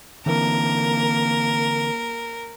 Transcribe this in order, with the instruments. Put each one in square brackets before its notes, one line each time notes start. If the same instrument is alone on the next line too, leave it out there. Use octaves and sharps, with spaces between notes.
[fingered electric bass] D3 E3 C4 [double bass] A#3 [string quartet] A#4